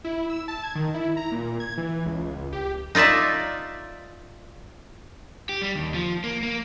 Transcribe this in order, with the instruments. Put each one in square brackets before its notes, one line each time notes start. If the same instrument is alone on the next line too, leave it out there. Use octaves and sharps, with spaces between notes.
[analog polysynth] E4
E6
A5
G#6
D#3
E4
A#5
A#2
G#6
E3
C#2
G4
[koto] D#4 F4 D5 E5 A5
[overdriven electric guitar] G4
G3
D#2
F3
A#3
A#3